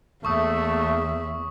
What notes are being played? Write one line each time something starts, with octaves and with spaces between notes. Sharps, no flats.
E2 A3 A#3 E5 C#6 D#6